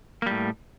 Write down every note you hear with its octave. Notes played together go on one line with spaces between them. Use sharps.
A2 G3 A#3